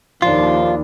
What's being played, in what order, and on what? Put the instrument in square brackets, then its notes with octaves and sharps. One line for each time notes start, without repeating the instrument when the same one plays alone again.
[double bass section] D#2 [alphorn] F3 [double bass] D4 [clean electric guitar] F4